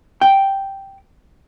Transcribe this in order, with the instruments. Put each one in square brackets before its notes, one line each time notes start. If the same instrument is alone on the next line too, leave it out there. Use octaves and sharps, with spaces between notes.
[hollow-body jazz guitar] G5